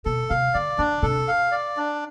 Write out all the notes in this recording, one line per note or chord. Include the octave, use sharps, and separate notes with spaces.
B2 A4
C3 F5
D3 D5
D3 D4
C3 A4
F5
D5
D4